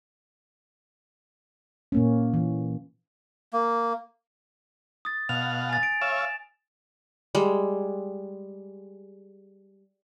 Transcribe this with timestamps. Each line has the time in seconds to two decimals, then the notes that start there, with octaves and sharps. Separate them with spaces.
1.92 A#2 A#3 C#4
2.34 E3
3.53 A#3
5.05 D#6 A6
5.29 B2 F5 F#5 F7
5.69 G#5 A6
5.83 D7
6.01 C#5 E5 F5 E7
7.35 G3 G#3